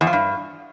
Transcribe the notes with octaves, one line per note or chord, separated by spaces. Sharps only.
E2
F3
G2